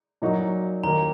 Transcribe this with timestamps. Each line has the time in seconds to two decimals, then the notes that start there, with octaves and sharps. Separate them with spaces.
0.22 A#2 F#3 A#3 D#4 F#4
0.83 D#2 D#3 A#3 A#5